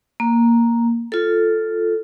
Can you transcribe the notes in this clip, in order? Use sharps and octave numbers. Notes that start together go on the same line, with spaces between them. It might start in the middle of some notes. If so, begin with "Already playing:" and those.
A#3
F4 A4